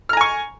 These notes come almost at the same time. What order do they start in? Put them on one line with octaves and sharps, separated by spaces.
F6 A#5 G#5 C#6